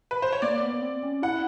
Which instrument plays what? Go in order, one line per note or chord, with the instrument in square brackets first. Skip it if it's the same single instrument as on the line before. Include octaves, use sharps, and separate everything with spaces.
[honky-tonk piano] B4
C5
C#5
[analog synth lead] A#3 [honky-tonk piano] D5
[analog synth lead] B3
C4
C#4
[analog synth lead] E4 [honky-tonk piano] F#5